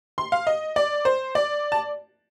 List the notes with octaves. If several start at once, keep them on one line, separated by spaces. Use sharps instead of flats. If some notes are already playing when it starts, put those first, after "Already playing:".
C6
F5
D#5
D5
C5
D5
A5